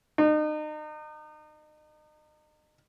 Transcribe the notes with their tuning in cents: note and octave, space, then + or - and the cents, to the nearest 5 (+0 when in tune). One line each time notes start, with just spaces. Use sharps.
D#4 -35